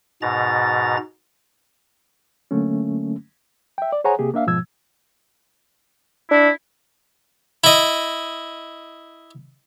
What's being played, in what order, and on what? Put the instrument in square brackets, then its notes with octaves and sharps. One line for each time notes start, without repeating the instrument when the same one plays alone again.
[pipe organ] G#2 B2 A#5 A6
[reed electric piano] D3 F#3 A3 A#3 C#4
E5 G5
D5
G#4 C5 C#5 F#5 G#5 A#5
C3 A#3 G4 G#4
A#3 D4 E5 F5
G#2 B2 F3 E6 G#6
[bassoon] D4 [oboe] E4
[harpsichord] E4 D#5